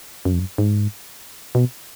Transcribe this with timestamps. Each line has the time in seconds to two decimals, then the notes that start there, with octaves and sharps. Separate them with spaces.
0.25 F#2
0.33 F2
0.40 F#2
0.58 G#2
1.55 B2